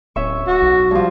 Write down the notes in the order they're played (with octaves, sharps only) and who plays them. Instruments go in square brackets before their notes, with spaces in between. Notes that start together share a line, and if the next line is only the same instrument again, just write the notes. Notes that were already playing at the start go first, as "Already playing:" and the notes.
[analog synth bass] D1 [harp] C#4 E5 C#6
[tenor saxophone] F#4
[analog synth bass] B1
[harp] G2 F3